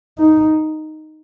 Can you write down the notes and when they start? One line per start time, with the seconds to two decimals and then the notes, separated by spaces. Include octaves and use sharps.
0.19 D#4